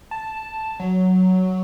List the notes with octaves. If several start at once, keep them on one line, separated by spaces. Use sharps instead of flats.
A5
F#3